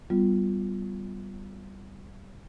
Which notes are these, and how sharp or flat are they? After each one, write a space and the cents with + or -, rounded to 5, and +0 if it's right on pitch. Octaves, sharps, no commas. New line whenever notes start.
G3 -15 B3 +0 F4 +0